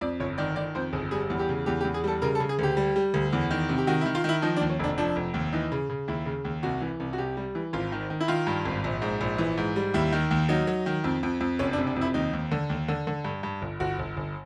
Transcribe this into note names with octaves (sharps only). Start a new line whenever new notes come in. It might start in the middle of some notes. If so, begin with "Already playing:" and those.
F2 D5
G1 C#5
D#3 D5
D#3 D5
F2 C5
G1 G#4
G3 G#4
E2
G4
C#3
E2 G4
G4
E2
G#4
G3 A4
C#3 A#4
A4
C#3
G#4
D2 G4
G3
G3
D2
E2
D#3
C3
G4
D#3 F#4
E4
D#3
F4
D#3 E4
F3 D#4
D4
D#2
C#4
F1 D4
F3 D4
F1
D#2
E3 D#4
C#3
C#3
D#2 E4
C#3
D#2
C2 F#4
E3
C2
F#4
C2 G4
G3
E3
G#1 F4
D#3
D#3
E4
D#3 F4
G2
G#1
A#1
G#2
A#1
E3
G#2
G3
D#2 E4
D#3
D#2
F#3 D#4
F#3
D#3
F2
F2
F2
F#1 C#4
D4
C3
D4
F2
E4
D#2 D#4
D#2
D3
D#2
D3
D3
G2
G2
G1
G1 F#4
G1
G1